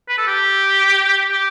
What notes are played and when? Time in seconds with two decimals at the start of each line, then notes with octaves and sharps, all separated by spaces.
0.09 B4
0.18 A4
0.27 G4
1.31 G4